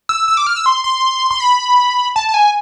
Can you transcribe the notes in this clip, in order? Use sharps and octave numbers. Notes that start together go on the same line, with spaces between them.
E6
E6
D6
F6
E6
C6
C6
C6
B5
A5
A5
G#5